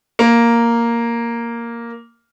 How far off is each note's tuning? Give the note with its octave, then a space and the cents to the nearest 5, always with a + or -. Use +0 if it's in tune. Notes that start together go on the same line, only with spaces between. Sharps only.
A#3 +0